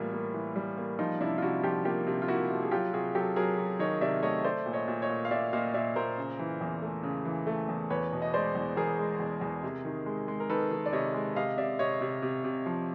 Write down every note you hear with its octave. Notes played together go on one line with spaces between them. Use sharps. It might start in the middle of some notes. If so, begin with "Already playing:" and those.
Already playing: A2 E3 G3 A#3 F4
A#3
E3
G3
A#3
F3 D#4 F4
C3 D4 E4
F4
C3 E4 F#4
F3 F4 G4
A#3 F4 G4
C3
F4
A#3 E4 F#4
C3
G#4
F#3 F4 G4
C3 F#4 G#4
F#3 G4 A4
F#3 G#4 A#4
F#3
D#3 C#5 D#5
C3 D5 E5
A3 C#5 D#5
A3 C5 D5
A#2
C#5 D#5
A#2
C#5 D#5
A#2
F5
A#2 D5 E5
A#2 D#5 F5
A#2 D5 E5
A#2 A#4 C5
C#3
E3
E2
A3
C#3
E3
A3
E2
E2 B4 C#5
B2
D#5
G#3 C5 D5
E2
E2 G#4 A#4
G#3
E2
E2
C3
D#3
G#3
G#3
A#4
D#3 A4 B4
D#3
D5
C3 C#5 D#5
G#3
C3 D#5 F5
C3 D5 E5
C3 C#5 D#5
C3
C3
C3
F3